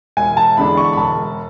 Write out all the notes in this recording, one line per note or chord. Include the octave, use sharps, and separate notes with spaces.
E1 G#5
A5
E2 D3 G#3 D4 B5
C#6
B5
E1 A5